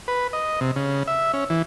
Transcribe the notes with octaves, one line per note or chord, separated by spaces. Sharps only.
B4
D#5
C3
C#3
E5
C#4
E3